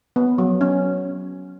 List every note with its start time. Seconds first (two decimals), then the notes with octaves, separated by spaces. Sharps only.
0.16 B3
0.38 F#3
0.61 C#4